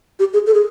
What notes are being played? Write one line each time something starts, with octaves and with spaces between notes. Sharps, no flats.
G4
G#4
A4
G#4